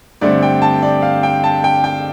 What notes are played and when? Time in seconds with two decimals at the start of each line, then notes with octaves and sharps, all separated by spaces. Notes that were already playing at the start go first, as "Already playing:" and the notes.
0.21 G2 D3 A3 C4 D5
0.43 G5
0.62 A5
0.83 D5
1.02 F5
1.23 G5
1.44 A5
1.64 G5
1.84 G5